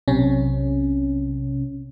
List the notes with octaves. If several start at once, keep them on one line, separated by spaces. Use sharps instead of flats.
B1 C3 C#4